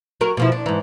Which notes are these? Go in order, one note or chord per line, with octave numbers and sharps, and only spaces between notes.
F#3 A#4
B2 F3 E4
D4
G#2 E3